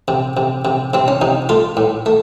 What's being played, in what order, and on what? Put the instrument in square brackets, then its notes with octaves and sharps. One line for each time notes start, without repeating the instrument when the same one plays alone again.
[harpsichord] C3
C3
C3
C3 C4
C#4
C3 D#4
A3 F4
A2
A3